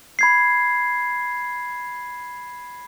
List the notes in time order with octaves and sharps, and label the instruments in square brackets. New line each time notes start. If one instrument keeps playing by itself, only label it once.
[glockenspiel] B5 G#6 C7